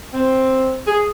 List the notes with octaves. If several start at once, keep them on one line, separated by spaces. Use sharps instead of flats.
C4
G#4